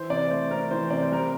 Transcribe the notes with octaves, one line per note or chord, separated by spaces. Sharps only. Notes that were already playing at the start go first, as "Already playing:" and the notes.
Already playing: E3 C5
C3 D5
A3 C5
C4 A#4
E3 C5
C3 D5
C5
G3 A#4